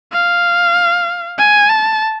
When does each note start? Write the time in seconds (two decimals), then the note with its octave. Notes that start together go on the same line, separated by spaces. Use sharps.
0.13 F5
1.38 G#5
1.70 A5